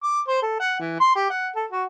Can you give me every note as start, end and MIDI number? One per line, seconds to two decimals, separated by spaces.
0.03 0.20 86
0.28 0.39 72
0.42 0.58 69
0.60 0.78 78
0.79 0.96 52
1.00 1.12 84
1.15 1.29 67
1.30 1.48 78
1.56 1.66 69
1.71 1.84 66